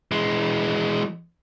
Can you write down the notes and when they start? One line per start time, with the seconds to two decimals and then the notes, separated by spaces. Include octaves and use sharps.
0.12 E3 G#3